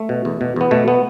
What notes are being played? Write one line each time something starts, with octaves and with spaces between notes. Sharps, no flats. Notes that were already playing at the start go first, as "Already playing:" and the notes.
Already playing: A3
B2
E2
B2
E2 B3
B2 A3
B3